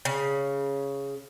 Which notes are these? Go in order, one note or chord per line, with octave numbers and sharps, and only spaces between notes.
C#3